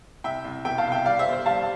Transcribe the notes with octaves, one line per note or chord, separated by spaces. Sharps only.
C2 E5 G5
C2
B2 E5 G5
F5 A5
C2
E5 G5
G3 D5 F5
C5 E5
G1
C5
G3 F5 A5